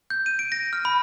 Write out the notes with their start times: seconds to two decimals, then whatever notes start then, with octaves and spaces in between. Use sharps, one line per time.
0.10 G6
0.26 D#7
0.39 D7
0.52 A#6
0.73 F6
0.85 B5